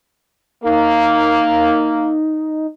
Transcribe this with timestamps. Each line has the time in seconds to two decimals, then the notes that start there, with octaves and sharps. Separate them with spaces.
0.64 A#3 D#4